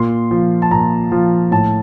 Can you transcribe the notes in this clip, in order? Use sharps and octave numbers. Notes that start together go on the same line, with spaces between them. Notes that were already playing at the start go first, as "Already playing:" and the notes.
Already playing: A#2 C6
F3
A5
A#2 A#5
F3
A2 A5